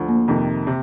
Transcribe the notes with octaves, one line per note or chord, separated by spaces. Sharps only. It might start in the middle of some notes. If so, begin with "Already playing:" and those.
Already playing: D2 F3
A#3
F2 C3 D#3
C3